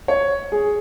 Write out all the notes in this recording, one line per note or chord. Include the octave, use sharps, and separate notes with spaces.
C#5
G#4